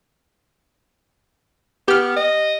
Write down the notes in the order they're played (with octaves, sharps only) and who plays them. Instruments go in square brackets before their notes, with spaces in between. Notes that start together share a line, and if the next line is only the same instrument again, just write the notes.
[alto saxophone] B3 [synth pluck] G4 F6
[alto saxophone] D#5